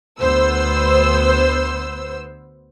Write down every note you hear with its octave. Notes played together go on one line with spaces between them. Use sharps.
D2 B3 C5 E6